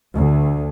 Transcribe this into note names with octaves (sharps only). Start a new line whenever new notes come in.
D2